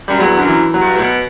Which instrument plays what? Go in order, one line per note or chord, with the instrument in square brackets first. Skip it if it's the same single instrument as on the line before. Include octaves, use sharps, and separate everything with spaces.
[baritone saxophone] F#2 [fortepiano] G3
[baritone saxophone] E2 [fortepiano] F#3
[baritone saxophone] F#2 [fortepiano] D3
[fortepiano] E3
F#3
[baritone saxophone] G2
A2
B2